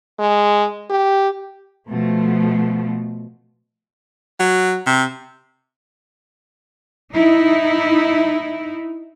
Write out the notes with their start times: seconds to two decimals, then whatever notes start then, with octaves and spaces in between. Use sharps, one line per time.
0.19 G#3
0.90 G4
1.89 B2 F3 A3
4.40 F#3
4.87 C3
7.12 D#4 E4